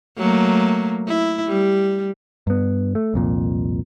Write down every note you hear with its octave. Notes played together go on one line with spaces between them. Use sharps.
F#3 A3 A#3
E4
G3
G2 B3
A3
C2 F2 A#2